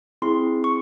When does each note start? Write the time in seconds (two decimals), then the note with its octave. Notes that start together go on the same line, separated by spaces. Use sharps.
0.22 C4 E4 G#4 C6
0.64 C#6